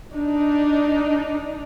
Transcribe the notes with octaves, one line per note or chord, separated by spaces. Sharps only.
D4 D#4